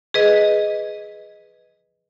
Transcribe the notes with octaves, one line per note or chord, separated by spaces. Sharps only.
G#4 B4 D#5